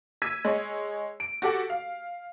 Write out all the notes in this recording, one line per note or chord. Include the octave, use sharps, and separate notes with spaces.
E6 G#6 B6 D#7
G#3 C#5
D7
F#4 G4 A4 F#5
F5